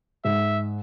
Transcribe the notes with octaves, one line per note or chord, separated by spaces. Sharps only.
G#2 E5